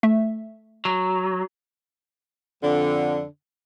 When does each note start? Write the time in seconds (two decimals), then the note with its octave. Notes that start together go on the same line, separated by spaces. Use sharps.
0.03 A3 E5
0.85 F#3
2.63 F2 D3